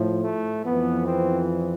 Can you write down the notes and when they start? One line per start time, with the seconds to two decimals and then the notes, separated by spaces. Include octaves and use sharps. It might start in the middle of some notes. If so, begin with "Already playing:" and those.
Already playing: A2 F3
0.24 A3
0.65 F2 E3 B3
1.07 C4